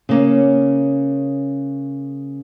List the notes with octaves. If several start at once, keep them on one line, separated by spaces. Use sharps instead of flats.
C#3 A#3 C#4